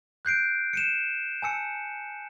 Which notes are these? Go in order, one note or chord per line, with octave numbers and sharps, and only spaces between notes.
F#6 G6 C7 D7
C#7 D#7 E7
G#5 A5 E6 C#7